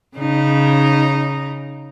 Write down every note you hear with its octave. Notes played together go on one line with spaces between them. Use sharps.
C#3 D#4